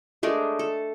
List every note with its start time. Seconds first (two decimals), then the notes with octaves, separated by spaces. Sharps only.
0.23 G#3 A3 D4 A#4
0.59 A4